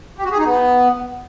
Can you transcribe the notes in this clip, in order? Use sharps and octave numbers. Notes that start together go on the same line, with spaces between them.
G4
F#4
G#4
D#4
B3